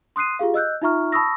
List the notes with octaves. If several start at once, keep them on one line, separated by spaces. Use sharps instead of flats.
C6 D#6 F#6 C7 D#7
F4 G4 G#4 F5
D#5 E6 F#6 G6
D#4 F4 E5 A#5 C#6 F6
A5 B5 C#6 D#6 E6 A#6